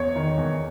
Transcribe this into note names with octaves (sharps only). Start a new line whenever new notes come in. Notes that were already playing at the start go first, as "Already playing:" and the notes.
Already playing: E2 C#5
D#3
E2